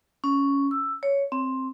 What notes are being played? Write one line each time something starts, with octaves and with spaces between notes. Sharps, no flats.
C#4
E6
C#5
C4